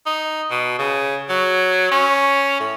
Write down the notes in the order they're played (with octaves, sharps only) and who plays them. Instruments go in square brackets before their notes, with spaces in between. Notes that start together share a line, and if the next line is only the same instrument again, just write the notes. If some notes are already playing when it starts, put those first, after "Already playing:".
[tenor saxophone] D#4
B2
C#3
F#3
C#4
A2